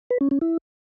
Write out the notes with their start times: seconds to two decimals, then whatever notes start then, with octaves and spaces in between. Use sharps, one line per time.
0.10 B4
0.21 C#4
0.31 C#4
0.41 E4